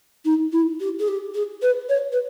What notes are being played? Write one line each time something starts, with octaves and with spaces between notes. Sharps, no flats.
D#4
E4
G4
G#4
G4
G#4
B4
C#5
B4